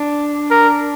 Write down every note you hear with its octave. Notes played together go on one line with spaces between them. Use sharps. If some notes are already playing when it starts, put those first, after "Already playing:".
Already playing: D4
A#4